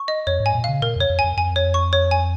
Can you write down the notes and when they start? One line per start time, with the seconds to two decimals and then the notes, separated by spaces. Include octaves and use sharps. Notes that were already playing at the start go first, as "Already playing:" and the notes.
Already playing: C#6
0.08 D#5
0.27 F2 C#5
0.40 G#2
0.46 G#5
0.55 A#2
0.64 C#3 F5
0.82 A#2 A#4
0.96 F2 C#5
1.10 F2
1.19 G#5
1.24 F2
1.37 F2 G#5
1.56 C#5
1.74 C#6
1.93 C#5
2.11 G#5